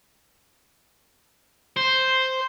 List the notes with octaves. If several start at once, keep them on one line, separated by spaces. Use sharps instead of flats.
C5